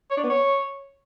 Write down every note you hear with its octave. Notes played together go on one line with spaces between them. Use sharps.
C#5
D4
B3
C#5